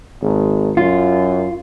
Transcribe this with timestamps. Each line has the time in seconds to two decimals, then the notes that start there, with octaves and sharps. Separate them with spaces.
0.21 G#1
0.77 F#2 F4